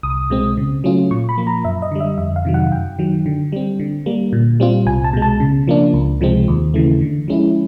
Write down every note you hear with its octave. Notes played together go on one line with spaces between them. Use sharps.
C2 D#6
B2 G#3 C4
C#3
F#3 A3 C#4 F4
A#2 C#6
B5
F3 A#3
A#5
F#2 E5
D#5
D3 G3
E5
F2 E5
F5
C3 D#3 F#3
F#5
F#2 G5
D#3 F#3
D3
G3 C4
D3
G3 A#3
A#2
G3 C4 F4
C2 G#5
A5
B2 G#3
A5
C#3
F3 A#3 D4
C#2
C3 F3 G#3 C4
D#2
C#3 E3 A3
D3
F3 G#3 C#4 E4